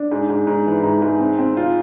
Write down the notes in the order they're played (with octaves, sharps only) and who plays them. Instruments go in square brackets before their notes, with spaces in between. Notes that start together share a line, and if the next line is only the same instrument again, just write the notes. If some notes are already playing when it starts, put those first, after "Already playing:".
Already playing: [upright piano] D4
G#2
G#2
G#2
E3
G#2
G#2
C4
C4
F4